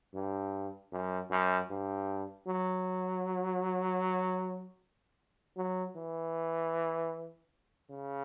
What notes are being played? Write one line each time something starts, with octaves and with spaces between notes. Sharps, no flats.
G2
F#2
F#2
G2
F#3
F#3
E3
C#3